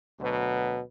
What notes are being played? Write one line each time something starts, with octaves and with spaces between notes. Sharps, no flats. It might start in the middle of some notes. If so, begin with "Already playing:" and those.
D2 B2 F#3 B4